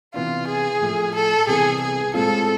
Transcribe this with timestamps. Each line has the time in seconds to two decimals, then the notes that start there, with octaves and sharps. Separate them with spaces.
0.14 C3 E3 B3 D4 F4
0.47 G#4
0.81 A2 F3 A3
1.14 A4
1.47 C2 C3 E3 B3 G#4
1.81 G#4
2.14 A2 G#3 C4 F4 A4